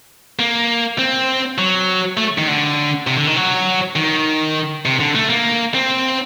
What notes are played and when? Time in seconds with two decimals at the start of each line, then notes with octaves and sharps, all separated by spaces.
0.39 A#3
0.99 C4
1.58 F#3
2.17 A3
2.38 D#3
2.48 D3
3.07 C3
3.17 D3
3.27 D#3
3.36 F#3
3.96 D#3
4.86 C3
5.00 D3
5.15 A3
5.30 A#3
5.74 C4